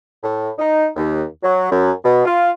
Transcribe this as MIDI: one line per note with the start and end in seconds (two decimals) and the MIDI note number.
0.23 0.50 45
0.58 0.87 63
0.96 1.24 39
1.43 1.69 54
1.71 1.91 42
2.04 2.23 47
2.26 2.49 65